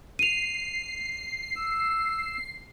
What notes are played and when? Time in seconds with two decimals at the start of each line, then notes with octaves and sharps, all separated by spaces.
0.19 C7 D#7 F7
1.56 E6